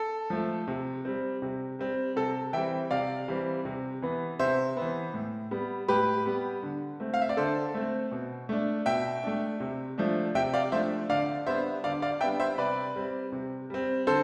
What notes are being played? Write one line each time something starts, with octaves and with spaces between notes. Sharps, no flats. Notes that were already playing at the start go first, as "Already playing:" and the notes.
Already playing: A4
F3 A3
C3
G3 C4
C3
G3 C4
C3 A4
E3 G3 C4 E5 G5
C3 D5 F5
E3 G3 C4
C3
E3 B3
C3 C5 E5
E3 B3
A2
G3 B3
A2 G4 B4
G3 B3
D3
A3 C4
F5
E5
D5
D3 A4 C5
A3 C4
B2
A3 D4
B2 E5 G5
A3 D4
C3
F3 A3 D4
C3 E5 G5
D5 F5
F3 A3 D4 C5 E5
D3 D5 F5
G3 B3 D4 C5 E5
D3 D5 F5
D5 F5
G3 B3 D4 E5 G5
C5 E5
C3 B4 D5
G3 C4
C3
G3 C4
D3 A4 C5